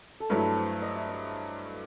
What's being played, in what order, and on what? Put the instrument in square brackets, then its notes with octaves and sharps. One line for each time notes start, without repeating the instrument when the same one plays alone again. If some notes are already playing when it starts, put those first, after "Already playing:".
[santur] A4
[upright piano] G2 F#3 A3 E4 [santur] B4
[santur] C5
D#5
E5
D#5